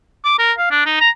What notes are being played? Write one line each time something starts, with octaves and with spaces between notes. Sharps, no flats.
D6
A#4
F5
D4
D#4
A#5